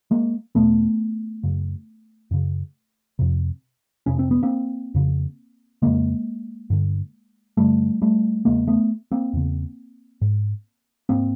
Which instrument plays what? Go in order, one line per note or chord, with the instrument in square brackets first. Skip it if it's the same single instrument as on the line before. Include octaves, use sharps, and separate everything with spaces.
[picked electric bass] G#3 A#3
E2 B2 A3 B3
F#2 C#3
F#2 C#3
F2 C3
F2 C3 C#4
C4
B3
A#3 C4
F2 C#3
F2 C#3 G#3 A#3
G2 D3
G2 D3 G3 A3
G3 A3
E2 C#3 G#3 A#3
A3 B3
A#3 C4
E2 C#3
G#2
G#2 A#3 C4